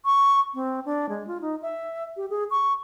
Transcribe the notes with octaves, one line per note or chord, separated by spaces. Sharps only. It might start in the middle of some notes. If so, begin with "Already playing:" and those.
C#6
C4
D4
G#3
F4
D#4
E5
G4
G#4
C#6